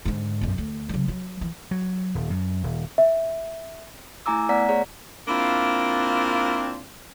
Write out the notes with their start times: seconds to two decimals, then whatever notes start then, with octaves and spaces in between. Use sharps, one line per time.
0.05 G#2 D3
0.41 B1 F#2
0.58 D2
0.89 C#3 F#3
1.08 F#3
1.41 E3
1.71 F#3
2.15 D#1
2.30 F#2
2.63 D#1
2.98 E5
4.26 A3 E4 G#5 A#5 D6 E6
4.49 A3 B3 D5 F#5 A#5 B6
4.69 G#4 C#5 D5 A#5
5.28 A#3 C4 D4 E4 F4 F5